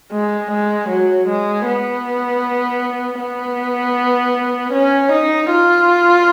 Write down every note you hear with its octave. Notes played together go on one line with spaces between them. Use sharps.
G#3
G#3
F#3
G#3
B3
B3
C#4
D#4
F4